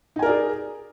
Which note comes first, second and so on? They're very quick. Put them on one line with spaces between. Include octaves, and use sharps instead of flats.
D#4 G#5 A#4 D5 G#4